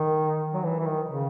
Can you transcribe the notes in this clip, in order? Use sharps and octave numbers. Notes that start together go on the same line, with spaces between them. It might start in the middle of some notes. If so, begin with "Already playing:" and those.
Already playing: D#3
F#3
E3
E3
D#3
C#3